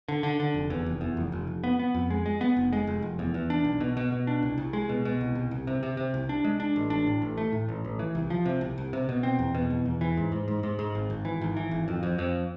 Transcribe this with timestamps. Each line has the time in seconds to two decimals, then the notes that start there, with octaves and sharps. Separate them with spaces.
0.08 D3
0.23 D3
0.40 D3
0.54 F1
0.70 E2
0.86 F1
1.01 E2
1.17 F1
1.32 F1
1.47 F1
1.64 B3
1.79 B3
1.94 F2
2.10 G#3
2.26 G#3
2.41 B3
2.57 F1
2.73 G#3
2.87 F1
3.02 F1
3.19 E2
3.34 E2
3.50 D4
3.65 B1
3.80 B2
3.97 B2
4.12 B2
4.27 D4
4.43 C2
4.58 C2
4.73 G#3
4.89 B2
5.05 B2
5.21 C2
5.35 C2
5.51 C2
5.67 C3
5.83 C3
5.97 C3
6.14 C2
6.29 D4
6.44 G#3
6.60 D4
6.76 A1
6.90 D4
7.07 A2
7.22 A1
7.38 A3
7.53 A2
7.69 A1
7.85 A1
7.99 E3
8.15 C2
8.30 F3
8.45 C3
8.61 C2
8.78 C2
8.93 C3
9.09 B2
9.23 C4
9.39 E2
9.55 B2
9.70 E2
9.85 E2
10.01 E3
10.17 G#2
10.32 G#2
10.48 G#2
10.63 G#2
10.79 G#2
10.95 G#1
11.10 G#1
11.25 E3
11.41 G#1
11.57 E3
11.71 G#1
11.88 F2
12.03 F2
12.18 F2